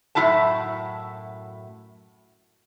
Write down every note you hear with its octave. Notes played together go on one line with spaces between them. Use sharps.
F#2 A2 F3 E4 F#4 A5